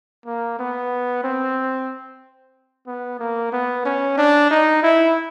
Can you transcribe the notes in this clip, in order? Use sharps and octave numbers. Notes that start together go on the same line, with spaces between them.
A#3
B3
C4
B3
A#3
B3
C#4
D4
D#4
E4